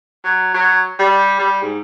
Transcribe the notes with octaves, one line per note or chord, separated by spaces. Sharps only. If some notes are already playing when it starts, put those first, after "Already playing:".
F#3
F#3
G3
G3
G#2